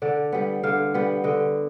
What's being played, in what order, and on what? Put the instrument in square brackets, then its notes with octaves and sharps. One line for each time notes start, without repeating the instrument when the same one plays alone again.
[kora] D3 D5
G3 B3
D3 F5
G3 B3
D3 D#5